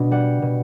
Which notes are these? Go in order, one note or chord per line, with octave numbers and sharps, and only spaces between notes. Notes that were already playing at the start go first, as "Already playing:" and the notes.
Already playing: B2 D4
G3 F#5
B2